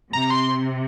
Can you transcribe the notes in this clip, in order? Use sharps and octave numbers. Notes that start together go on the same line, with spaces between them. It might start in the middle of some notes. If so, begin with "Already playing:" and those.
C3 A#5
C6